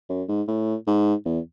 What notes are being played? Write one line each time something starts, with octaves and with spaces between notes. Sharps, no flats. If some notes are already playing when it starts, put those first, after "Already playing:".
F#2
G#2
A2
G#2
E2